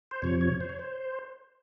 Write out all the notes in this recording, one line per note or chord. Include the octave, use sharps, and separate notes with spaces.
C5
F2 C3 F3 C#5
C#5
C5
C#5
C5